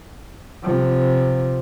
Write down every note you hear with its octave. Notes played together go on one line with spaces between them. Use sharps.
C3 F3